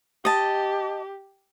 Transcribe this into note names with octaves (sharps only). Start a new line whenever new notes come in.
G4 D#5 A5